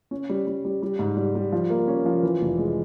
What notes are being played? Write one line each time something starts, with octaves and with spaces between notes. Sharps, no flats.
C#4
G3
G3
G3
G3
G#2
G3
G3
F3
A#3
C#4
F3
E3
F1
G#3